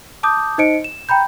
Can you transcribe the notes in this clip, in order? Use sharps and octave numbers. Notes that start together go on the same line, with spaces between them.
A5 D6 D#6 G6
D#4 C5 D#5 C#7 D7
E7
G5 A#5 B5 G6